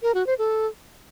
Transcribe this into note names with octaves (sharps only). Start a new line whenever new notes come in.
A#4
F#4
C5
A4